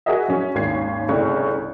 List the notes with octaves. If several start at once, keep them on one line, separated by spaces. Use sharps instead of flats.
F#4 G#4 A#4 D#5 E5
F#2 C#4
G#1 D#2 C#4 G#6 C7
G1 C2 C#3 A3 C#6